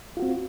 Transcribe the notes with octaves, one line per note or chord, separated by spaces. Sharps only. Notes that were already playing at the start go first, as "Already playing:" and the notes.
C4 F4 F#4